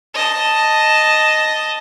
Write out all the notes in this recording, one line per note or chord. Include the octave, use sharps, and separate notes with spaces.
D#5 A5